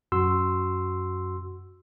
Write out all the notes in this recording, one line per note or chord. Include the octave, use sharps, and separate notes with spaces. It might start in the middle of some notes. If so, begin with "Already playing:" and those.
F#2 F#4 C6 E6